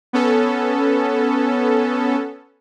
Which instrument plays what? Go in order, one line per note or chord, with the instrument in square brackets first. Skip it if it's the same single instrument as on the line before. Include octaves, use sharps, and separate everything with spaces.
[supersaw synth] B3 C#4 A4